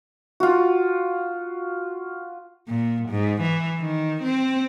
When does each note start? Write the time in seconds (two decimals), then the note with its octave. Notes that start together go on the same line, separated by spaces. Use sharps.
0.40 F4 F#4
2.68 A#2
3.09 G#2
3.42 E3
3.80 D#3
4.23 C4